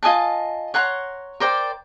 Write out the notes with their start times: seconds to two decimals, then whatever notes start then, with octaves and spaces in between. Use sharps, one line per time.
0.03 F4 D#5 G#5 A5
0.74 C#5 F#5 A#5 C6
1.40 A#4 C5 D5 G5